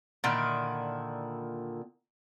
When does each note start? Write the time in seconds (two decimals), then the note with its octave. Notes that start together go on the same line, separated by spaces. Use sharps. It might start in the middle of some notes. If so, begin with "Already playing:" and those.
0.24 A#2 D3 D#3 E4